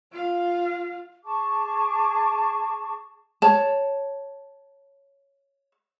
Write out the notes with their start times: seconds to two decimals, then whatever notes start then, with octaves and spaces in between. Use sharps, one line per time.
0.12 F4 F5
1.24 G#4 A5 C#6 D6
3.42 C#5 A5